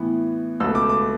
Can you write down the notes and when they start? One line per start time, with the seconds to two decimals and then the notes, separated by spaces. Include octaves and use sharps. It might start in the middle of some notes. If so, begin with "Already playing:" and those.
Already playing: A2 E3 B3
0.60 C#2 B2 A3 E6
0.75 D6
0.89 D6